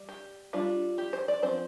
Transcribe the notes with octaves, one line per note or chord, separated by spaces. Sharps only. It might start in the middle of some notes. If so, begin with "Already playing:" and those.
Already playing: G3
G4
G3 D4 F4
G4
C5
D5
F3 C4 C5